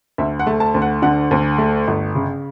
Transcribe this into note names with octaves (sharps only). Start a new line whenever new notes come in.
D2 E5
F#5
A3
A5
D2
F#5
D3 F#5
D2
A3
G1
C#3